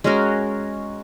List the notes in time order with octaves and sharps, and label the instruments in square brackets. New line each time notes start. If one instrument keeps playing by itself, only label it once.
[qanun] G#3 C#4 F#4 A#4